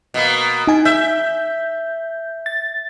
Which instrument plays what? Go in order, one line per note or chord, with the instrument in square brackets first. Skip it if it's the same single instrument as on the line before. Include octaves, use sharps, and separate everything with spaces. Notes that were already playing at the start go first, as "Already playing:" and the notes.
[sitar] B2 A#3
[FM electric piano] D#4 G#5
[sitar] E5 [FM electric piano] G6
[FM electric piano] A6